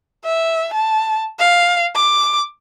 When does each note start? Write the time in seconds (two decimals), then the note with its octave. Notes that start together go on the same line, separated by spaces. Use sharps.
0.24 E5
0.74 A5
1.39 F5
1.96 D6